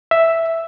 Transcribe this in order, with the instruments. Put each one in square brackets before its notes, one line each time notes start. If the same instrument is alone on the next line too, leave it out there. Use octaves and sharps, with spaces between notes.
[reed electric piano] E5